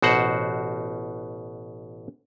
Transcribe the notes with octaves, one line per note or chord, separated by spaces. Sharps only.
A1 B2 F#4 C5 F#5